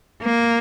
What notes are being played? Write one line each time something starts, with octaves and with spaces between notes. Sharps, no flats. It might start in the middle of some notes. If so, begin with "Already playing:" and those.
A#3